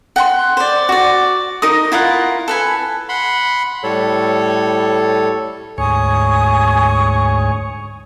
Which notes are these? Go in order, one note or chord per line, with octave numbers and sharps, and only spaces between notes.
F#5 G5 A#5 C6
C5 D5
F#4 D5
D#4 A#4 D#6
E4 F4 A#4 F#5
A4 B4 G#5
F#5 B5 C6
A2 G3 A4 C#5
D2 G#2 C#5 G#5 C#6 D#6